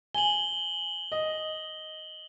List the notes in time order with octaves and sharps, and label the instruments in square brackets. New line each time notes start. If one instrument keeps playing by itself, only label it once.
[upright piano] G#5 [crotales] F#7 G7
[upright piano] D#5